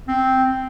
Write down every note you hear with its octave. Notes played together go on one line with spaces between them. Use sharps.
C4